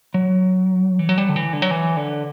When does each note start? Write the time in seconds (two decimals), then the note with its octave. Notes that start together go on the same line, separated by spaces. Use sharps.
0.14 F#3
0.99 E3
1.09 F#3
1.18 G3
1.29 D3
1.36 E3
1.53 D3
1.62 F#3
1.71 E3
1.97 D3